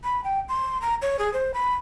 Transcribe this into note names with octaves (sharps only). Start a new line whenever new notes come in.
B5
G5
C6
A#5
C#5
G#4
C5
B5